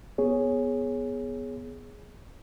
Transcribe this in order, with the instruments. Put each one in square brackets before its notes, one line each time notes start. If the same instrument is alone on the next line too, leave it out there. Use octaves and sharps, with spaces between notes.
[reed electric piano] B3 G#4 C#5